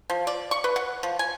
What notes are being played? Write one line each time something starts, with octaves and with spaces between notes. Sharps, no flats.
F3
D5
C#6
B4
F#5
F3
G#5